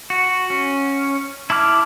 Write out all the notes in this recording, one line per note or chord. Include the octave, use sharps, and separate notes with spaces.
F#4
C#4
E4 A5 D6 F6